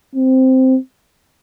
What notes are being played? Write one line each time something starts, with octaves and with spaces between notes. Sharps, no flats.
C4